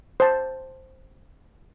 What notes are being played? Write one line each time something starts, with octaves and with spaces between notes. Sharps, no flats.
C5 A5